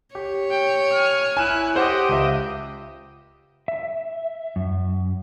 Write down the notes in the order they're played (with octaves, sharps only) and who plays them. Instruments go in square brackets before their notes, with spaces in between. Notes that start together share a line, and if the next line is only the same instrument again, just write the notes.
[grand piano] G4 [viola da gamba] C#5
[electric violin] G5
G#5 F6
[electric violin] E4 F#6 [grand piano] G#5 E7
[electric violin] G4 D#5 [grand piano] C5 F#5
[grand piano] C#2 E5
[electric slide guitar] E5
F#2